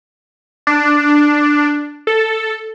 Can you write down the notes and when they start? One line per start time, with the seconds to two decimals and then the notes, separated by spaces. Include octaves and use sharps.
0.67 D4
2.07 A4